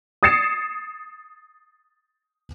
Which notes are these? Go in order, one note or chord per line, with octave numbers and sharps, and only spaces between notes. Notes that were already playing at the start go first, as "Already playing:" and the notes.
D#6 G#6 A6 C7 C#7 E7